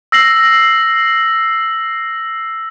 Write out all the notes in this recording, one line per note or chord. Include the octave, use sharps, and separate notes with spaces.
E6 A#6 C7 F#7